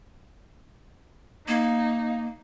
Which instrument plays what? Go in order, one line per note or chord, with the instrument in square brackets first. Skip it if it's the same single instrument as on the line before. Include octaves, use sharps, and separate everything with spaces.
[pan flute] A#3 [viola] D#4